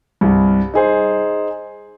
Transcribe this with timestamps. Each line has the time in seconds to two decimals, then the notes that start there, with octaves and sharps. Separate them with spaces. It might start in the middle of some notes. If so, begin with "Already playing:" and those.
0.21 C2 G2
0.74 D#4 G#4 C5